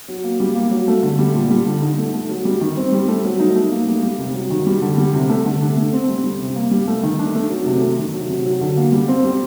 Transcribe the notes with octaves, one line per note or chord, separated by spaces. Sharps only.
F#3
A#3
G3
A#3
F#3
A3
D3
G3
A#2
G3
D3
D#4
A3
A3
F#3
G3
D#3
C4
G3
A3
F#3
D#4
A3
A#3
G3
G3
C3
F#3
D#3
G3
D3
G3
C3
A3
D3
D4
A3
C4
G3
G3
C3
A#3
G3
A3
D#3
D4
A3
F#3
C3
A3
D#3
F#3
C3
F#3
D3
A#3
G3
C4
G3